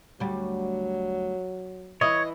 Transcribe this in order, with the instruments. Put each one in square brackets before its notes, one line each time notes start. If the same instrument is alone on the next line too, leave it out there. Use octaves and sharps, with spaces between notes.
[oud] D2 G3 [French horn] F#3
[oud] E3 E4 [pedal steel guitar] C#5 [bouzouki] D#5